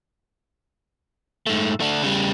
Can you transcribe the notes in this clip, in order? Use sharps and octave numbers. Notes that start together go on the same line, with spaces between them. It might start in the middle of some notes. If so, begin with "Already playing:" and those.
G#2 A3
A3 D4
C#3 G3